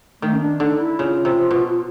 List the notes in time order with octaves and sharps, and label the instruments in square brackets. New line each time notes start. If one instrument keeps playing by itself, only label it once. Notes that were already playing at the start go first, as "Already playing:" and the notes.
[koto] D#3 [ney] A3
[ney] C#4
D4
[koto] D3 [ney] D#4
[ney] E4
[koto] C#3 [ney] F4
[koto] C3
B2